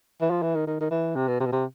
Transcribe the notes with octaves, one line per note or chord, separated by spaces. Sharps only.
E3
F3
E3
D#3
D#3
D#3
E3
C3
B2
C3
B2
C3